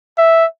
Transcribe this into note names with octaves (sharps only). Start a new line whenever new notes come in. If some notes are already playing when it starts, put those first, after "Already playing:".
E5